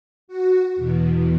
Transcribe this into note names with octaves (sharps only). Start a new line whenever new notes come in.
F#4
E2 B2